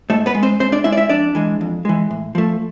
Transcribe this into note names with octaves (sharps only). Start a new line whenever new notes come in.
G#2 A3 A4
B3 B4
G#3
C4 C5
G#2 C4 C5
D4 D5
G#3 E4 E5
D5
E4 E5
F2 D4 D5
E3 G#3
F2
E3 G#3
A2
F3 A3